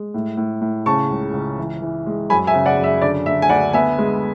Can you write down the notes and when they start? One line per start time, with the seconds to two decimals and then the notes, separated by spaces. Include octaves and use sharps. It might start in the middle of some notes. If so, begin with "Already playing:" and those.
Already playing: G#3
0.14 A2
0.37 A2
0.61 A2
0.86 C#3 A5 C#6
1.11 C#2
1.33 C#2
1.58 E3
1.82 E3
2.07 G#3
2.30 F#2 G#5 B5
2.47 E5 G#5
2.54 C#3
2.66 D5 F#5
2.78 F#2
2.84 E5
3.01 D3 D5
3.26 D3 E5
3.42 G#5
3.49 D2 D5 F#5
3.73 B3 E5 G#5
3.98 G#3